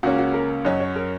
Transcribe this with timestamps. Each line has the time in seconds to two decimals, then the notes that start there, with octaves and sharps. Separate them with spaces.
0.03 C#2 C#3 A#3 C#4 F#4
0.18 F#4
0.34 A#4
0.65 F#2 F#3 C#4 D#5
0.80 C#5
0.96 A#4